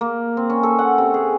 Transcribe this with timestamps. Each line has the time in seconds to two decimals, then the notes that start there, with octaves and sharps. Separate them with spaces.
0.01 A#3
0.37 C4
0.50 C#4
0.63 A4
0.79 F#5
0.98 C3
1.14 G#4